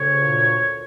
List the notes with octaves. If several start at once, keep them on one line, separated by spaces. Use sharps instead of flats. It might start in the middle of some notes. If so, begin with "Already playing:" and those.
Already playing: D2 C#3 C#5
A#2